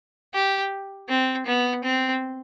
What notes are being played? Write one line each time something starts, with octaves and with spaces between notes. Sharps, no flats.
G4
C4
B3
C4